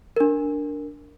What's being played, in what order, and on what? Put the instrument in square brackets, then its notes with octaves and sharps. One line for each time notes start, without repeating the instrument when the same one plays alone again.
[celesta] D4 A#4